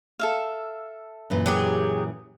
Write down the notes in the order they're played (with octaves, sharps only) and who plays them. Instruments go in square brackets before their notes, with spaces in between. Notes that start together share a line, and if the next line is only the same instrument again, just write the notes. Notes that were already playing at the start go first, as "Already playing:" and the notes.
[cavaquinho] A4 E5 F5
[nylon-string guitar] F#2 A#2 E3
[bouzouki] F#3 G4 G#4